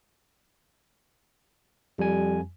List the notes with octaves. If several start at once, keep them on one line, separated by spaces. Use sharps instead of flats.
F2 G3 G#5